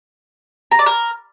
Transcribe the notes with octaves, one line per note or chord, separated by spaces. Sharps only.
A#5
D5
A#4